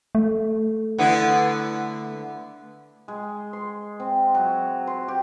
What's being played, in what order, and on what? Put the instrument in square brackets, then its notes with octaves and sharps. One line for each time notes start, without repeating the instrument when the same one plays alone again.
[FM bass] A3
[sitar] D3 B3 E4
[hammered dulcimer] G#3
C6
C4
F#3
C6
G4